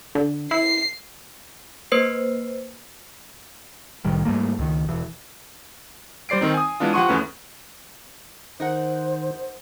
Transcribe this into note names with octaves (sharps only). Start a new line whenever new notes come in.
D3
E4 C7
A#3 B4 C5 C7
C2 A2 D#3 G3
G#2 G3 A3 A#3
C#2 D#3
E1 E3
G3 C5 D5 C7 D7
D#3 C4 D#4
G#5 D#6
E3 G#3 B3 D4 F4
F3 G4 F#5 C6 C#6 D#7
E2 A3 C#4 B4
D#3 D#4 A#4 C5 F#5